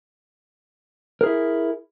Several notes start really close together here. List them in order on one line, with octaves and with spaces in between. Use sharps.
A#4 G#4 E4